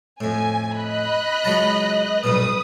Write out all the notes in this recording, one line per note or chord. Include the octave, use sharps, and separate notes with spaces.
F2 A2 G#5
D#5 B5 F#6
C#2 F#3 A5
B1 G2 A#2 B4 D#6